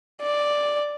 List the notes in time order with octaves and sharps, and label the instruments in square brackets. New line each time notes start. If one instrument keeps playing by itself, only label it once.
[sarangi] D5